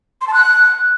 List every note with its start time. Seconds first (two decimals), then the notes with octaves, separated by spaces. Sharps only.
0.21 C6
0.27 A5
0.34 F#6